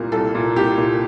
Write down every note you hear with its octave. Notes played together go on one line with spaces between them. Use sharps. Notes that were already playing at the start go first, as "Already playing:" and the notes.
Already playing: C2 A#2 A#4
C2 A4
A#2
C2 G4
A#2